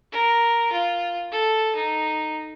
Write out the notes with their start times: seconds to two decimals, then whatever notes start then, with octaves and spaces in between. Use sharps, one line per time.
0.12 A#4
0.73 F4
1.32 A4
1.76 D#4